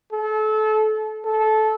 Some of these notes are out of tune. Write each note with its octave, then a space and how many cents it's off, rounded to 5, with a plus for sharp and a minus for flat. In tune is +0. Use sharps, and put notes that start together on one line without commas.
A4 -30
A4 -20